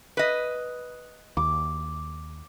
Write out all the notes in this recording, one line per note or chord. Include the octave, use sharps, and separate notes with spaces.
B4 D#5
D#2 D6